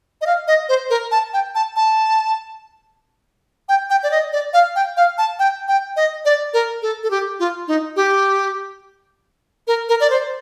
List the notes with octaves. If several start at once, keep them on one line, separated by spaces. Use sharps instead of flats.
D#5
F5
D#5
C5
A#4
A5
G5
A5
A5
G5
G5
D5
D#5
D5
F5
G5
F5
A5
G5
G5
D#5
D5
A#4
A4
A4
G4
F4
D#4
G4
A#4
A#4
D5
C5